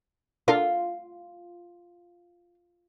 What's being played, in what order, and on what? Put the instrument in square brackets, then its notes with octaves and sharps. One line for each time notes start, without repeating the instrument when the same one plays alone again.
[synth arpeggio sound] D4 A4 A#4 [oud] F4